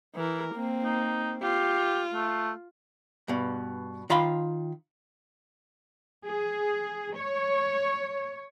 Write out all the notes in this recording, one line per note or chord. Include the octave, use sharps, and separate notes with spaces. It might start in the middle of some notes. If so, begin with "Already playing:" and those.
E3 A#4
A#3 C4
D#4
F4 G4
A3
G2 B2
D#3 F4 F5 B5 C6
G#4
C#5